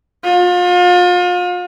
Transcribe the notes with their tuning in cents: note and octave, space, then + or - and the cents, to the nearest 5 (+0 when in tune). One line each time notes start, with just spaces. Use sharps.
F4 +35